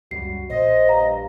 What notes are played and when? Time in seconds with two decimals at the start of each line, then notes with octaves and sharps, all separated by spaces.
0.11 C#2 F#2 G3 F#4 C7
0.50 A#1 C5 D#5
0.88 G2 F5 A#5